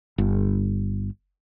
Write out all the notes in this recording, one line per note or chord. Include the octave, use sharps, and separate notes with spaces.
G1